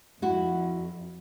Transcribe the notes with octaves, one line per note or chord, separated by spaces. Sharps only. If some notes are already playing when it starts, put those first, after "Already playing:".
F2 E4 F#4